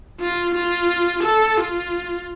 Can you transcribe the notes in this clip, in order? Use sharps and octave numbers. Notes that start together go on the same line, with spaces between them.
F4
F4
A4
F4